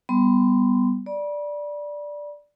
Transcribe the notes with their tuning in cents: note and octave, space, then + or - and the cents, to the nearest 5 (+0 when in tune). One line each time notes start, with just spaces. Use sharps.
G3 +0 B3 +0 C6 -15
D5 +0 B5 -40